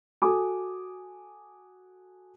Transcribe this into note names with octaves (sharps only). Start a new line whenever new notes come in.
F#4 A4 G#5 D6 D#6